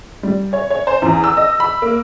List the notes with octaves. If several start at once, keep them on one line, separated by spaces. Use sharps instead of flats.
G3
C#5
C#5
C5
E2
E6
D#5
B5
A#3